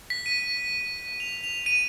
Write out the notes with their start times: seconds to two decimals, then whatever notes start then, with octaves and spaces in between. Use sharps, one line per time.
0.10 B6
0.26 D#7
1.20 F7
1.44 F7
1.66 D#7